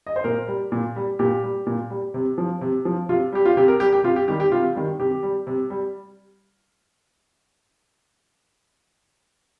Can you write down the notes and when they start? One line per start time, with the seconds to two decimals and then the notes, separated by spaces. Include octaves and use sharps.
0.07 D#5
0.16 C5
0.24 A#2 A#4
0.48 G3
0.72 A#2
0.96 G3
1.19 A#2 G4
1.43 G3
1.67 A#2
1.90 G3
2.14 C3
2.38 F3
2.61 C3
2.85 F3
3.09 C3 F4
3.33 G3 G4
3.45 F4
3.57 C3 G4
3.68 A#4
3.80 G3 G4
3.93 G4
4.04 C3 F4
4.16 G4
4.28 D#3 G3 G4
4.40 G4
4.52 C3 F4
4.75 D#3 G3
4.99 C3 G4
5.23 G3
5.47 C3
5.70 G3